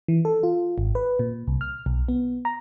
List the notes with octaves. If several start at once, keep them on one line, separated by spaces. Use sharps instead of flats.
E3
A4
F4
G#1
B4
A#2
C2
F6
B1
B3
A#5